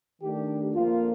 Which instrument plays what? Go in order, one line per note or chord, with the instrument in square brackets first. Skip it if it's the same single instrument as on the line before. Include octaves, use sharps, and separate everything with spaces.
[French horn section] D#3 A3 D4 [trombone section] G4
[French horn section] F2 D3 F3 A#3 [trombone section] F4